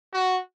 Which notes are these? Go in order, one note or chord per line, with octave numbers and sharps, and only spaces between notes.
F#4